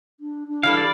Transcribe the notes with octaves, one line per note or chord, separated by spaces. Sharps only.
D4
D4
E3 G3 A4 F5
D5